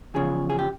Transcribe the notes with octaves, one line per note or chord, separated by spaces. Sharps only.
E2 C#3 F3 G#4
G#4
G4